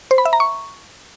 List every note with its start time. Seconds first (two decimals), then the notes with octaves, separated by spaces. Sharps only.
0.11 C5
0.18 B5
0.25 E5
0.33 A#5
0.40 C#6